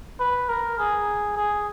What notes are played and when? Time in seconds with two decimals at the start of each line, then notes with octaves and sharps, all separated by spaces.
0.20 B4
0.49 A#4
0.79 G#4
1.37 G#4